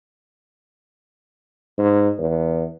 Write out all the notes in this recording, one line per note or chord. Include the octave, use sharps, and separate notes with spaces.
G#2
E2